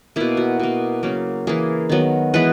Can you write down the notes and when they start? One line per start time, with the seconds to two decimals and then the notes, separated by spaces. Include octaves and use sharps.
0.16 B2 A#3 E4
0.37 F#4
0.60 B2 A#3
1.03 C#3 F#3 A#3
1.47 E3 A#3 G#4
1.89 D#3 F#3 B3
2.34 E3 G#3 B3 B4